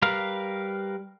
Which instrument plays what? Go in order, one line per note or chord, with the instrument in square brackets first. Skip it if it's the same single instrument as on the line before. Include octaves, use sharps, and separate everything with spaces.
[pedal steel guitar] G3 A#4 B4 F5